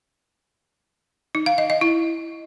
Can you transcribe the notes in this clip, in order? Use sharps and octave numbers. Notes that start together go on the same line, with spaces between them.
D#4
F5
D#5
D#5
E4